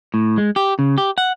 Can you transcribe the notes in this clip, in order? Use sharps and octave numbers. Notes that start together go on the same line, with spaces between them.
A2
G#3
G4
C#3
G4
F#5